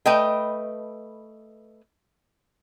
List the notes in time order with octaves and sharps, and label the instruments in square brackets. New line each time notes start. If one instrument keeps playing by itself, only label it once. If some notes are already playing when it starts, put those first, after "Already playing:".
[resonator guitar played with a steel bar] A3 B4 D#5 G5